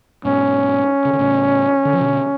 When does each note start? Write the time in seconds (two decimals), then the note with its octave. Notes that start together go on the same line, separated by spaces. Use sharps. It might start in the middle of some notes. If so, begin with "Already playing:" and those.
0.25 G#2 B2 C#4
1.05 C#3
1.13 D3
1.19 A2 C#3
1.85 D3
1.93 F3
2.00 B2 D3